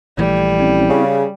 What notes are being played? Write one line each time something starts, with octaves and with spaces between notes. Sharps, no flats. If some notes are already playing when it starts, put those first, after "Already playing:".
A#1 E3 G3 A3
C4 C#4 E4
C#3